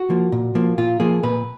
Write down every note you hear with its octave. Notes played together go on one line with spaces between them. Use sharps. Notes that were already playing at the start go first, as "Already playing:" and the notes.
Already playing: F#4
F3 A#3
A#2
F3 A#3
A#2 F4
F3 A#3 G#4
A#2 B4